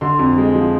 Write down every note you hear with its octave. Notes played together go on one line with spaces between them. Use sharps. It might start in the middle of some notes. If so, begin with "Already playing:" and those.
D3 C6
F2
G#3
F3